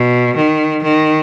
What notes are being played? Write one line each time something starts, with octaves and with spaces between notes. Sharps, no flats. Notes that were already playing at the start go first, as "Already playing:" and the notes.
Already playing: B2
D#3
D#3